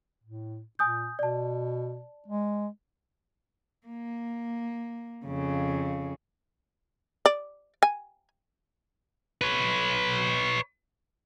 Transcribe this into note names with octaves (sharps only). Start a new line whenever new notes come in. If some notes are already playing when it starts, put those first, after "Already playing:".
A2
A#2 G#5 D#6 G6
B2 D5 A5
G#3
A#3
F2 C#3
D5
G#5
B4 C#5